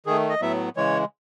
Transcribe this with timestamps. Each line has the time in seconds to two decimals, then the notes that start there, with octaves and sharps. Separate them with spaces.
0.06 D#3 A3 G#4
0.29 D#5
0.41 A2 F#3 B3 E5
0.76 C#3 E3 G#3 C#5